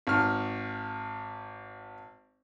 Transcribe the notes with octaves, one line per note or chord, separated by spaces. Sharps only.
G#1 F6